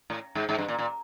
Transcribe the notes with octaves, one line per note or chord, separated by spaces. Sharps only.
A2
G#2
G#2
G2
A#2
A#2